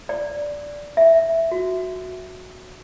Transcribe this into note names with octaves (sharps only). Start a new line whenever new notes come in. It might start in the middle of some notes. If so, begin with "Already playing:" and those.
D5
E5
F#4